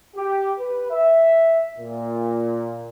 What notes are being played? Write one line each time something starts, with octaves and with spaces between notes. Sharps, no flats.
G4
B4
E5
A#2